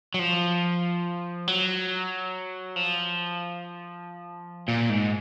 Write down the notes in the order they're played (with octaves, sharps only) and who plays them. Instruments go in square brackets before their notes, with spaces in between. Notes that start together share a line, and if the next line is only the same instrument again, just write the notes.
[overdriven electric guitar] F#3
F3
F#3
F3
A#2
G#2